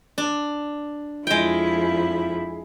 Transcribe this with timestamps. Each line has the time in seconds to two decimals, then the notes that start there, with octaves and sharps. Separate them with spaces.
0.18 D4
1.27 F2 F3 G#3 E4 G5